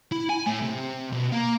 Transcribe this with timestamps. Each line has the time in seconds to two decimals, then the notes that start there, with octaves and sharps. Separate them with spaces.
0.12 E4
0.29 G#5
0.46 A2
0.62 C3
1.13 B2
1.32 A#3